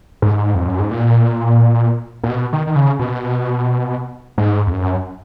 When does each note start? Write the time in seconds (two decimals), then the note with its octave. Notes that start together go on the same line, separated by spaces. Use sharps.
0.22 G#2
0.55 F2
0.67 F#2
0.79 G#2
0.91 A#2
2.24 A#2
2.29 B2
2.53 D#3
2.67 D#3
2.76 C#3
2.99 B2
4.38 G#2
4.67 F2
4.72 F#2